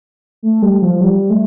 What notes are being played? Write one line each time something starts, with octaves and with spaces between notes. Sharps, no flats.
A3
G3
F3
G3
A3